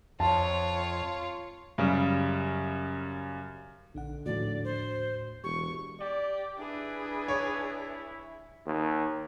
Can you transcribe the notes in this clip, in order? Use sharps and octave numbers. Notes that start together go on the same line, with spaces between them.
F2 F4 C#5 A5
F#2 C#3 G3
A#1 D3 D4 F#5
D#2 A2 F3 A3 F#4 D5
C5
E1 G4 C#6
G4 D5
D4 E4 G#4 B4
C#5
D#2